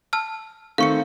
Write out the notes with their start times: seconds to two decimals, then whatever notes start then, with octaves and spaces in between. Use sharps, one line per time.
0.13 A5 E6 F6
0.78 D#3 A3 C4 F5 C#6 C#7